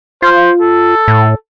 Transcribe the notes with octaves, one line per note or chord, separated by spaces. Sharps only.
F4 C5
A4
A2